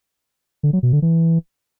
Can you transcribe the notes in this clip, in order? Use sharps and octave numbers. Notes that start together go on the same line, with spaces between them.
D3
F#3
B2
D3
E3